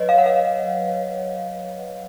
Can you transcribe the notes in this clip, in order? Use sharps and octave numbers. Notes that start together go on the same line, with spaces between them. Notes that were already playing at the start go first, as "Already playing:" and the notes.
Already playing: F#3 B4 C#5 D#5
F5
F#5
F5